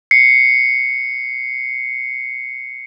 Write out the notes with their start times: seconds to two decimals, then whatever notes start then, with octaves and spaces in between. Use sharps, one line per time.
0.11 C7 C#7